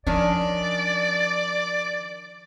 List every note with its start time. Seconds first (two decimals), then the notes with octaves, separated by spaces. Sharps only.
0.07 D#3 F3 C#4 D4 D5